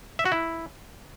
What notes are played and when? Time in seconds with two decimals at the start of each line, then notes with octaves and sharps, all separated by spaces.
0.19 E5
0.25 F#4
0.32 E4